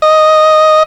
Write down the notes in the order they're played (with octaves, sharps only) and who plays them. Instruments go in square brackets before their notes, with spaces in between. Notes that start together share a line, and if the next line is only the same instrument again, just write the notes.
[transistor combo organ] D#5